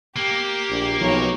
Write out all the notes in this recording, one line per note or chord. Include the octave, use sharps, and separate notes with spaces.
A#3 G4
A#1
B1 F3 D#4 C#5